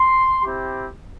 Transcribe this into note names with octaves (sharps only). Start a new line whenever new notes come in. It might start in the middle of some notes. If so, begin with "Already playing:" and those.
Already playing: C6
C4 E4 G4